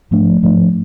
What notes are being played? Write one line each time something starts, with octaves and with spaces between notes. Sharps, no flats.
G#2 F3 A3 D4
G#2 F3 A3 D4